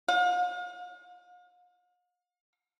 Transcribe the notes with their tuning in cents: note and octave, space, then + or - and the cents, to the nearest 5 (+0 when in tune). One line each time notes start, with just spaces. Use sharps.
F5 +40